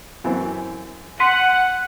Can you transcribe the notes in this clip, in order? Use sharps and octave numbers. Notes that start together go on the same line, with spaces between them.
F#2 E3 C4
F#5 C6 F#6 B6 D#7